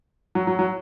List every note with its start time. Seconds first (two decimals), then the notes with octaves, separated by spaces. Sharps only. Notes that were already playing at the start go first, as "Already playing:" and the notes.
0.35 F#3
0.47 F#3
0.59 F#3